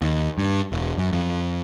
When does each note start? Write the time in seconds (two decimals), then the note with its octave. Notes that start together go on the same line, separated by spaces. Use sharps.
0.02 D#2
0.38 G2
0.72 E1
0.97 F#2
1.13 F2